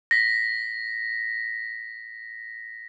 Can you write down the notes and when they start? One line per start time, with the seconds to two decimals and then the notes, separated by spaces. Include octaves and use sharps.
0.11 A#6 B6